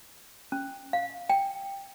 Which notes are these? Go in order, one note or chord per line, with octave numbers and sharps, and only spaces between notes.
C#4
F5
G5